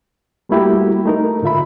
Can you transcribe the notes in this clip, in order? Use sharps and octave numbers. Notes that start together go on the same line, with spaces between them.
G3 A3 A#3 E4 F#4 G4
A3 D#4 A#4
G#2 D3 F4 E5 B5